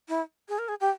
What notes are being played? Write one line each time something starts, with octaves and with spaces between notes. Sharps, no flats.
E4
G#4
A#4
G#4
G4